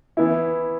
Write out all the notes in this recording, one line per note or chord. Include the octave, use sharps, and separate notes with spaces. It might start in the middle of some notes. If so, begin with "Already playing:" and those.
E3 B3 E4